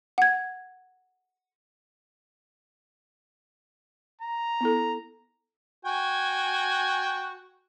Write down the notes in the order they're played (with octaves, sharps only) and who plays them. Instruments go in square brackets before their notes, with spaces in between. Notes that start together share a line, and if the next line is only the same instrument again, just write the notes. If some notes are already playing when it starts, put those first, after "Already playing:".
[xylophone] F#5 G#6
[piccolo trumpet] A#5
[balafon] B3 E4 A4
[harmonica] F#4 G5 G#5